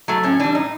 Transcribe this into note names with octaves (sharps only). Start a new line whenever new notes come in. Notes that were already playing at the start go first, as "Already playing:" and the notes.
F#3 A3
A2 C#4
E3 G3 D4
A2 D#4